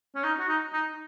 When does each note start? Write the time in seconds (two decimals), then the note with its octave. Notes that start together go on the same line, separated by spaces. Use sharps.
0.15 C#4
0.24 D#4
0.40 F#4
0.48 D#4
0.73 D#4